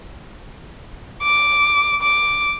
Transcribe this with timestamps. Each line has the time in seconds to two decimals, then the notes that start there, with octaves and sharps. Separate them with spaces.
1.23 D6
2.02 D6